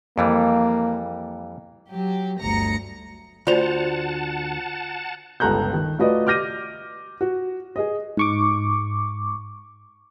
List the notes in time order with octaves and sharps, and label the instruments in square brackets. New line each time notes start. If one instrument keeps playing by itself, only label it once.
[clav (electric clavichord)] F2 E3 G3 [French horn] A#3
[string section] F#3 G4
G1 D2 A#5 A#6 C#7
[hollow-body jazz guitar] D2 C5 [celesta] F4 F7 [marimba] D5 [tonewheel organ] F#5 A5
[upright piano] G1 C#2 A4 A#5 F#6 G6
D#3
A3 F4 F#4 B4 D5 D#5
D6 F6 G6 A#6 D#7
F#4
G#4 D#5
[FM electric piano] G#2 C#6 D6